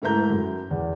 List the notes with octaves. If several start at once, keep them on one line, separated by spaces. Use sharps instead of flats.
G#2 A3 E4 A#4 A#5 G6
F#2
E2